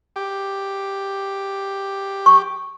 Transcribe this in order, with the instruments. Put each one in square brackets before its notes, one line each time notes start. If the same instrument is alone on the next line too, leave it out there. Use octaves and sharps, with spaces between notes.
[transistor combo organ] G4
[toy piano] C#6